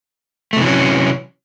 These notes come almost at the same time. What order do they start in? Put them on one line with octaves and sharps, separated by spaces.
A3 C3 E3 F#3 C#4